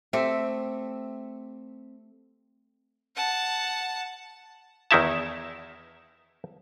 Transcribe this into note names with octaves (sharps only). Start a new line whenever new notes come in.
A3 C4 G4 E5
F#5 A5
E2 D#3 D#4 E4 E5 A5